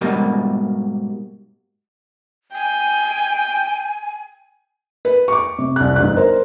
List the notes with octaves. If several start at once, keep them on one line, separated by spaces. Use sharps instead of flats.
G#2 B2 G3 A#3
G5 G#5
B4
C#6 D6
C3
C2 F#6
G1 D#4 F#6
A#4 C5 A#5